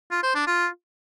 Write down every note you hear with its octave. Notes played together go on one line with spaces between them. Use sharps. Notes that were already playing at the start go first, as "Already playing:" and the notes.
F4
C5
D4
F4